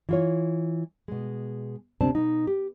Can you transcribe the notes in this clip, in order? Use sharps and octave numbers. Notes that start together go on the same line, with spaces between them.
E3 F4 C#5
B2 G#3
D2 C3 C4 D4 A5
B2 D#4
G4